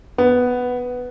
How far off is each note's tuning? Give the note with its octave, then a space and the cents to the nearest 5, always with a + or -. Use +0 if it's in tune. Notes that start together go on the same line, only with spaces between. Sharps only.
B3 +5